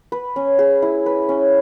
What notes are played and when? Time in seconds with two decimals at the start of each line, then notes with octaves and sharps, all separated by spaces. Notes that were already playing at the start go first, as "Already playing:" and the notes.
0.12 B4
0.36 C#4
0.59 G#4
0.82 E4
1.06 B4
1.29 C#4